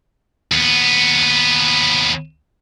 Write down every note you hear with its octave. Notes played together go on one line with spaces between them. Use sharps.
D#2 B3